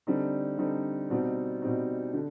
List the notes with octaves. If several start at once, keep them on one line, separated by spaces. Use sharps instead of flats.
D3 G3 C4 D#4
D3 G3 C4 D#4
B2 G3 C4 D#4
B2 G3 C4 D#4
D3